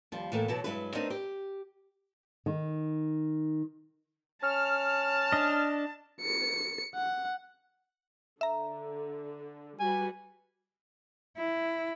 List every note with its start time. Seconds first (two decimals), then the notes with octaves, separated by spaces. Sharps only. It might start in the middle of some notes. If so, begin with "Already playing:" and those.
0.12 D#2 F3 G3
0.32 A2 E3 A3 A#3
0.48 B2 E3 F#3 A5
0.64 G2 F#3 G#3 E4 B4
0.95 A3 B3 C4 D4 D#4 A#4
1.10 G4
2.46 D#3
4.43 C#4 A5 F6
5.33 D4 D#5
6.21 C#7
6.95 F#5
8.41 D3 E5 A#5
9.80 G3 F#4 B4 G#5
11.37 E4